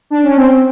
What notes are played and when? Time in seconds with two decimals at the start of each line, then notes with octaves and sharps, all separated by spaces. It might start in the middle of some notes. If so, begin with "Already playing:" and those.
0.10 D4
0.24 C#4
0.37 C4
0.50 C4